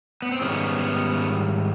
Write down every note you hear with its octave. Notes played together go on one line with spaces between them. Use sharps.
B3
C4
G#2 D#3 G3 B3 C#4